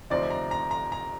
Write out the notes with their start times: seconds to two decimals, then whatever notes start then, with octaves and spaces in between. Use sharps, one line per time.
0.10 D2 C3 F3 C4 D#4 D5
0.30 A#5
0.51 A#5
0.71 A#5
0.92 A#5